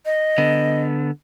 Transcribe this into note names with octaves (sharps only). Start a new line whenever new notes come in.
D#5
D3 B3